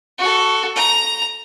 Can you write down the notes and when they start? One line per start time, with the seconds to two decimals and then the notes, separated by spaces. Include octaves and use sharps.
0.18 F#4 A4
0.76 A#5